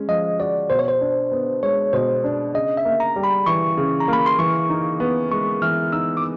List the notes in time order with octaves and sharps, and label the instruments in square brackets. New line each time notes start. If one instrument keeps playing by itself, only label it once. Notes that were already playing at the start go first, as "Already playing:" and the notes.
Already playing: [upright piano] G#3 C#4
[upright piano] F3 [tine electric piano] D#5
[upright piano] F#4 [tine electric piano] D5
[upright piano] B2 [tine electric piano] C5
[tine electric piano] C#5
C5
[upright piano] D4
B3
[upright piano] G#3 [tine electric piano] C#5
[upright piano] B2 [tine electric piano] C5
[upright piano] D4
[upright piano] C#3 [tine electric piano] D#5
[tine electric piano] E5
[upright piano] A#3
[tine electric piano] A#5
[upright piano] G3
[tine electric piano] B5
[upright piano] E3 [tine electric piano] C#6
[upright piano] C#3
[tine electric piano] A#5
[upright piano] A#3
[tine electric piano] B5
C6
[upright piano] E3 [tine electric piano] C#6
[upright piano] D#4
B3
[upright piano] G#3 [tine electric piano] C#6
[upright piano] E3 [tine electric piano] F6
[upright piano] D#4 [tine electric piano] E6
[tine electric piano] D6